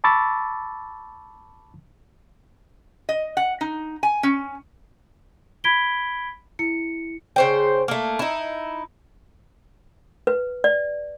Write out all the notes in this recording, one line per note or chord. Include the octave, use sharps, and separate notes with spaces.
A5 B5 C#6 D6 E6 A6
D#5
F#5
D#4
G#5
C#4
B5 G#6 B6 D7 G7
E4 C#7
C#3 C5 G5
A3 A#3
D#4 E4
B4
D5